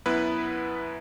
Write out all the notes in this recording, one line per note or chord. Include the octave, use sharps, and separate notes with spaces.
F#2 B3 E4 B4 F#6